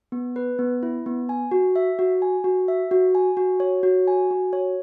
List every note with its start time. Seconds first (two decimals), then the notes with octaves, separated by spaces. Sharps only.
0.12 B3
0.36 B4
0.59 B3
0.83 E4
1.06 B3
1.29 G#5
1.51 F#4
1.76 E5
1.99 F#4
2.22 G#5
2.44 F#4
2.68 E5
2.91 F#4
3.15 G#5
3.37 F#4
3.60 C#5
3.83 F#4
4.08 G#5
4.31 F#4
4.53 C#5